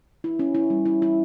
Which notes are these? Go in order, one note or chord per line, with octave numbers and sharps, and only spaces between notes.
E4
C#4
E4
G3
E4
E4